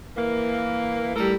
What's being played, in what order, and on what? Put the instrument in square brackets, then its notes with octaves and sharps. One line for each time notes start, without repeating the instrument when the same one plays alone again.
[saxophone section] E3 A#3
[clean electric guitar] A2 G3 [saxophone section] A4 A#4